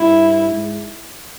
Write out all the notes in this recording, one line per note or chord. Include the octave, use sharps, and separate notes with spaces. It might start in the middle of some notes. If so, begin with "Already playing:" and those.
Already playing: G2 E4
G#2